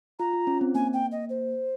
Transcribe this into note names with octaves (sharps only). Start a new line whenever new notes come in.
F4 A#5
F4
C#4
C4
A#3 G#5
G5
D#5
C5